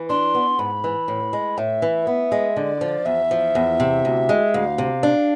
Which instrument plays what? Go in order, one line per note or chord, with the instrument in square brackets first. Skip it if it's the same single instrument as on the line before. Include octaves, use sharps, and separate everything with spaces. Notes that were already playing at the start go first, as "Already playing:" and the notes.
Already playing: [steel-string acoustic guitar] E3
[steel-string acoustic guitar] D4 [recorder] C6
[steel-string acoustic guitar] B3
[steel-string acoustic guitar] G#2 [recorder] B5
[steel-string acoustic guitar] E3
A2
G#3
[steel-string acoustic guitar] A2 [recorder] E5
[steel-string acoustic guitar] E3
B3
G#3
[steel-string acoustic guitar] D3 [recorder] D5
[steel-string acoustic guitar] F3
[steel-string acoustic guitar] E2 [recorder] E5
[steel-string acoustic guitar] F3
E2
C3
D2
G#3
[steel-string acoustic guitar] D2 [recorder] F5
[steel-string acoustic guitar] C3
D4